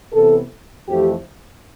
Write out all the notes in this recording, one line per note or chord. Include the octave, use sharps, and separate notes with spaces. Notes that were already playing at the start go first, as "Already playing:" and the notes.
C3 E3 B3 A4
F2 E3 A3 C4 G4